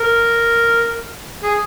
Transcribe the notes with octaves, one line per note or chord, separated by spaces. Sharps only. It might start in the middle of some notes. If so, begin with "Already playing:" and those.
Already playing: A#4
G#4